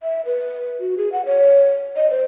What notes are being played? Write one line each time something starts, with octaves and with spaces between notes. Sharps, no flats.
E5
B4
F#4
G#4
F#5
C#5
D#5
C5